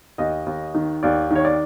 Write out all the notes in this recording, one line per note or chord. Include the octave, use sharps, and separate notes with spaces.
D#2 D#5
D#2
D#3
D#2 D5
D#3 C#5
D5